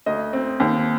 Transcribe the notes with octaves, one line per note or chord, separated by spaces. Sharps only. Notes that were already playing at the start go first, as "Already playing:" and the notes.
D2 D#5
C4
D#2